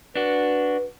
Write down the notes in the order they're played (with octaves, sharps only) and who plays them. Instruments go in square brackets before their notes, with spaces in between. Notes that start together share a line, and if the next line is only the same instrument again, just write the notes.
[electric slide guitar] D4 F#4 [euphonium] B4